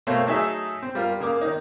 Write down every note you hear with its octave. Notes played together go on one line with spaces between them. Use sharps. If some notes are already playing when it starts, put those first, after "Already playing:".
B2 A3 A#3 C4 C#5 F5
F#3 A3 D#4 G#4 A4 E5
C4
G3 F4 A#4
C#3 A#3 A#4 D6
D#3 D#4